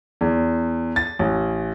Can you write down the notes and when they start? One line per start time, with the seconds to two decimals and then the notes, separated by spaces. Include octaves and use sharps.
0.21 E2
0.96 A6
1.19 A1